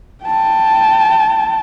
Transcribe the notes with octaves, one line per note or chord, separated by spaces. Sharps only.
G5 A5